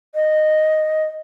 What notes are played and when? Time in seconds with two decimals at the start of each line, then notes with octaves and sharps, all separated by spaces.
0.15 D#5